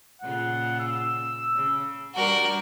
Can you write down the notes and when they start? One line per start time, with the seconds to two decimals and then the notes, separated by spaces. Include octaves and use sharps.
0.22 A#2 C#3 F4 F#5
0.80 E6
1.55 C#3
2.15 G3 D4 F#4 A#4